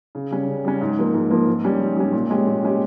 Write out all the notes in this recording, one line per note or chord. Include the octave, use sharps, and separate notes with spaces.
C#3
G3 C#4
C#3
G3 C#4
G#2
F3 A#3
G#2
F3 A#3
G#2
G3 C#4
G#2
G3 C#4
A#2
G#3 C#4 G4
A#2
G#3 C#4 G4